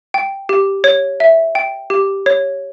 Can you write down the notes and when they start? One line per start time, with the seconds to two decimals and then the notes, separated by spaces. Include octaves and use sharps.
0.14 G5
0.49 G4
0.84 C#5
1.20 E5
1.55 G5
1.90 G4
2.26 C#5